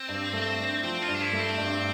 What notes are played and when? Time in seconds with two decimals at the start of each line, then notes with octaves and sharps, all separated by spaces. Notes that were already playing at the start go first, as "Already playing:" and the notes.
Already playing: C4
0.08 G2
0.33 A3
0.58 D4
0.83 F3 C4
1.02 F4
1.08 G2
1.15 D4
1.21 E4
1.33 A3
1.39 C4
1.58 G2